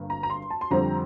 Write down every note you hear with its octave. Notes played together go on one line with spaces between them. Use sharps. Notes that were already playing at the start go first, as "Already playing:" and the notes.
Already playing: G1 G2 A#3
A#5
A#5
C6
A5
C6
F2 D3 G3 C4 A#5